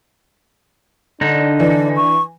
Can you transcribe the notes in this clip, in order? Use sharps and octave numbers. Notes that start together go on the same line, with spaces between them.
D3 D4 D#4
E3 D5
C#6